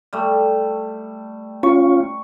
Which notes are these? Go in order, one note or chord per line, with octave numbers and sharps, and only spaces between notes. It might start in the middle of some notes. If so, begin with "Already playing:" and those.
G3 A3
C#4 F4 C#6